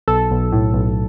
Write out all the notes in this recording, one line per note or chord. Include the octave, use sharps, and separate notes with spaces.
B1 A4
B1
A2
B1